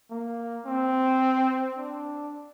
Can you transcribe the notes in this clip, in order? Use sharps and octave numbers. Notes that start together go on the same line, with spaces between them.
A#3
C4
D4